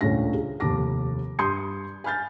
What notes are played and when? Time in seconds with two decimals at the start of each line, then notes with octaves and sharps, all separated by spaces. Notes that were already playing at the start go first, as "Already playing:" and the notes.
0.01 D#1 C#2 A3 C#4 D4 A#6
0.34 G#4
0.60 F1 D#2 A5 D6 A#6
1.39 G2 C6 D#6 G6 G#6 C#7
2.04 G#5 B5 F6 G6 A6